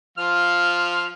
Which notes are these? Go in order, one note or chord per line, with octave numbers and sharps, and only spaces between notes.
F3 F4 F6